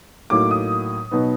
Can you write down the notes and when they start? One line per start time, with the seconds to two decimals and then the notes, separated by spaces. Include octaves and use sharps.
0.30 A2 F#3 A#3 D#4 D6
0.51 D#6
1.11 B2 F#3 B3 D#4